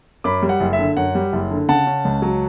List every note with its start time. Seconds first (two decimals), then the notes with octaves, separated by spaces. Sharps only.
0.24 F#2 B5 D6
0.43 G3
0.49 F#5
0.60 F#1
0.73 E5
0.79 D3
0.97 F#2 F#5
1.15 G3
1.33 F#1
1.51 D3
1.68 C#3 F#5 A5
1.87 C#4
2.05 C#2
2.22 F#3